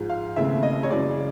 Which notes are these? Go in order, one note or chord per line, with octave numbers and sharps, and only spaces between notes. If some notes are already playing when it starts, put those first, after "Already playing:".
Already playing: G#2 F3 G#3
F5
D#2 C#3 E3 A3 C4 E5
D#5
C#5
F#2 C#3 E3 G#3 D5